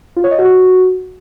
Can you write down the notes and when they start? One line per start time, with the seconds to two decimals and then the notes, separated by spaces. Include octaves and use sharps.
0.16 F4
0.24 C#5
0.31 D#5
0.39 F#4